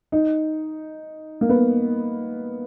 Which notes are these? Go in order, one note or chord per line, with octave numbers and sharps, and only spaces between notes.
D#4
A#3
B3